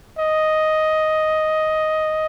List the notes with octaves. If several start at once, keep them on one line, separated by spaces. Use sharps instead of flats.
D#5